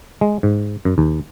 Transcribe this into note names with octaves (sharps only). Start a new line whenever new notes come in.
G#3
G#2
F#2
D#2